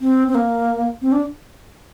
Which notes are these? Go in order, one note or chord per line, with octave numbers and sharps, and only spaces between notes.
C4
C4
A#3
C4
D4